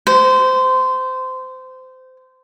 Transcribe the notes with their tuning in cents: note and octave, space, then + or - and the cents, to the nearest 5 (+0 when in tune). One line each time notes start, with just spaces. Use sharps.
C5 -20